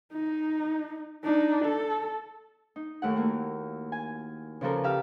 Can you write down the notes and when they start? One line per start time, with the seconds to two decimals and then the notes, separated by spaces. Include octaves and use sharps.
0.12 D#4
1.24 D4 D#4
1.64 A4
2.76 D#4
3.02 D#2 A3 E4 F#5
3.16 A#3 F#4
3.92 G#5
4.61 C#3 E3 F3 F4 A4 A#4
4.84 G4 E5 F5 F6